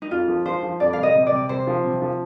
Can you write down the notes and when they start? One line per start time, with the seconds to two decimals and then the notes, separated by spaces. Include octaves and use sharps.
0.02 D#4
0.11 F2 F4
0.28 F3
0.46 F3 C5
0.63 F3
0.80 F2 D5
0.93 F5
0.98 C3
1.03 D#5
1.15 C3
1.27 D5
1.32 C3
1.49 C3 C5
1.67 F3
1.84 C3
2.02 F3